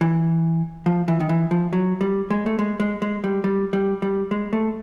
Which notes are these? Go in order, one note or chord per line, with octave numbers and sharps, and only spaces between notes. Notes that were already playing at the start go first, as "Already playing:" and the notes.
E3
F3
E3
D#3
E3
F3
F#3
G3
G#3
A3
G#3
G#3
G#3
G3
G3
G3
G3
G#3
A3